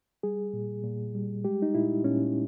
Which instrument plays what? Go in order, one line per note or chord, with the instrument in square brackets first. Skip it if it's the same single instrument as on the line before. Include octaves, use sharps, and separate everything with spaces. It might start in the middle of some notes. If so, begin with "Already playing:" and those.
[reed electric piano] G3 G#4
A#2
A#2
G3
G#3 G4
D#4
A#2 E4
A#2 C#4